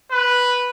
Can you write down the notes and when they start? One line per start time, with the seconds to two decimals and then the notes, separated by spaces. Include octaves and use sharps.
0.11 B4